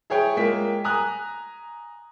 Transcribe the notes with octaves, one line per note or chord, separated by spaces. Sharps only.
E4 G#4 C#5 G5
G#3 A#3 F4 G5 B6
G#5 A#5 D#6 F#6